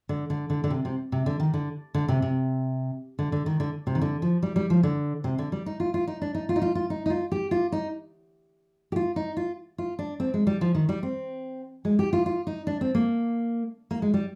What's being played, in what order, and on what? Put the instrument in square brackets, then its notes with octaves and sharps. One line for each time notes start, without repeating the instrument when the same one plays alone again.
[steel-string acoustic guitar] D3
D3
D3
D3
C3
C3
C3
D3
D#3
D3
D3
C3
C3
D3
D3
D#3
D3
C3
D#3
D3
F3
G3
G3
F3
D3
C3
D3
G3
D#4
F4
F4
D#4
D4
D#4
F4
D#4
F4
F4
D#4
D#4
F4
G4
F4
D#4
G4
F4
D#4
F4
F4
D4
C4
G#3
G3
F3
D#3
G3
C4
G#3
G4
F4
F4
D#4
D4
C4
A#3
A#3
G#3
G3